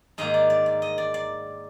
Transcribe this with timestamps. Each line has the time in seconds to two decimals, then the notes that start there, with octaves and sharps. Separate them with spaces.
0.18 G#2 D#3 A#3 D#5
0.34 D5
0.50 D5
0.66 D5
0.82 D#5
0.98 D5
1.14 D5